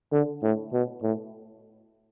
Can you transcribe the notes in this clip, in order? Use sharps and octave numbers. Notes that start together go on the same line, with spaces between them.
D3
A2
B2
A2